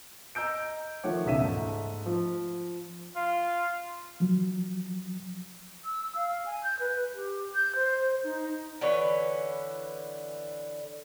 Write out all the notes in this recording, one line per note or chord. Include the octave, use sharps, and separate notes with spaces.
D#5 A#5 E6 G6 D7
D#3 F3 A3 C#5 F#5 D6
E1 C#2 E5 D#7
G#2 A3 A5
F3
F4
F3 F#3
E6
F5
G#5
G6
B4
G4
G6
C5
D#4
D3 E3 B4 C#5